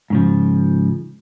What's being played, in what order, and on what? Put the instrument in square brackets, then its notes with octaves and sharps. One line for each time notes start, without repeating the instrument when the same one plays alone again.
[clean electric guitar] G#2 C#3 F3